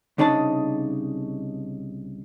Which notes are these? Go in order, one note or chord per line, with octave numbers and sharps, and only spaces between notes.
C2 C#3 D4 D#4 A5